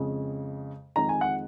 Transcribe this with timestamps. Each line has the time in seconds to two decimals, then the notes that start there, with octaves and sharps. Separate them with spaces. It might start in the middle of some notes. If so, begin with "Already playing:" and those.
Already playing: F2 C#3 G#3
0.96 F2 D#3 G#3 A#5
1.09 G#5
1.21 F#5